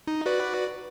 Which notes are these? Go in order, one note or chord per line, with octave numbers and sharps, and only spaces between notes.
D#4
F#4 B4 D5